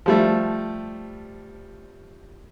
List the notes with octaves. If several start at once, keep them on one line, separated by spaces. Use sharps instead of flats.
F3 G3 A3